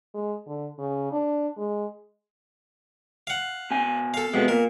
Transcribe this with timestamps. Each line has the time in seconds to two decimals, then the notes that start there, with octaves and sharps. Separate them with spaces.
0.14 G#3
0.46 D3
0.78 C#3
1.12 D4
1.57 G#3
3.27 F5 F#5
3.71 B2 G#5
4.14 A4 F5
4.34 F2 B2 G#3 B3
4.48 A#2 A#4